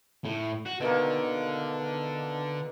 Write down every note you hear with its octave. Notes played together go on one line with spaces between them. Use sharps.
A2
F#4
B2 D3 D#3 A#3